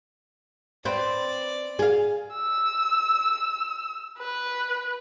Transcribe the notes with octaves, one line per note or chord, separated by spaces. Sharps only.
C4 B4 D5
G#4 F5
E6
B4